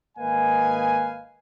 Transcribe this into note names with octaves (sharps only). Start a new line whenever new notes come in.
G#1 A#3 B4 D#5 F5 G#5